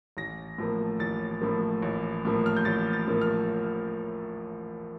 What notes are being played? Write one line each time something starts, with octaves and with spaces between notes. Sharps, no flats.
A1 A#6
A2 F3 A#3
A1 A6
A2 F3 A#3
A1
A2 F3 A#3
F6
G6
A1 A6
A6
A2 F3 A#3
F6